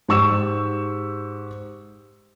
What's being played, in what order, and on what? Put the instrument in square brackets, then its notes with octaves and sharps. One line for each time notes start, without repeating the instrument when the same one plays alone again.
[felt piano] G#2 G4 C#6 E6 E7